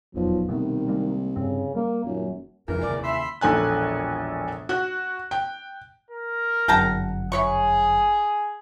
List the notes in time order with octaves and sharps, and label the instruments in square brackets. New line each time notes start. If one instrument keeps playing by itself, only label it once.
[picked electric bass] D#1 E2 [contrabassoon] B1 [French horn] F3
[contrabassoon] C2 [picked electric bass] B2 A3 B3 [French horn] D#3
[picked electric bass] G3 G#3 A#3
[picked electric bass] G2 C4 [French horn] C#3
[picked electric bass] G3 [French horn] A#3
[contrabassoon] D#1 [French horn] F#2
[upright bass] F2 [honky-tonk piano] G#2 C#3 E3 [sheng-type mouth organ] A#4
[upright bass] D#2 C3 [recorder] D5
[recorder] E5 [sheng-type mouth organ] B5 C6 E6
[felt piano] E1 A#1 A4 G#5 F#6
F#4 F#6
G5
[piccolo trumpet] A#4
[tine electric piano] G1 F#2 F#5 [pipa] G5 A5 A#5
[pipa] E4 C#5 C#6 [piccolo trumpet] G#4